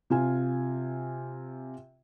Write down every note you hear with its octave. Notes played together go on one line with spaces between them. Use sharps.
C3 F4 G#5